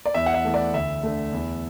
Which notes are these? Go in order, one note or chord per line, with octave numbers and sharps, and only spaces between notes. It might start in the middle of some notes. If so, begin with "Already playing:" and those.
D5
E2 E5
F#5
E5
E3 A3
D5
D2 E5
D3 A3
E2